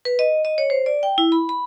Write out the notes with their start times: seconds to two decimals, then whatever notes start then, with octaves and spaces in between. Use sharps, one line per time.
0.05 B4
0.19 D#5
0.45 D#5
0.58 C#5
0.70 C5
0.86 D5
1.03 G5
1.18 E4
1.32 B5
1.49 B5